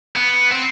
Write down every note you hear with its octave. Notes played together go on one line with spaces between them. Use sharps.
B3
C4